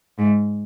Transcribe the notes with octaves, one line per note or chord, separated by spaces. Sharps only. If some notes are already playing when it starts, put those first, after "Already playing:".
G#2